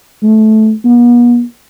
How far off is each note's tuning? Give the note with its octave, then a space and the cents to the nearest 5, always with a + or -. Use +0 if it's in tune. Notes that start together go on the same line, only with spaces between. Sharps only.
A3 -15
B3 -45